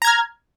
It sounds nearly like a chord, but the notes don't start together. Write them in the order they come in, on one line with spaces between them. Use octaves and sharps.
A#5 G#6 F6